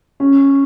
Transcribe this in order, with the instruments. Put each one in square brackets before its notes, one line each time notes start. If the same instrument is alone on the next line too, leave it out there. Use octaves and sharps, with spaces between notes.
[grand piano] C#4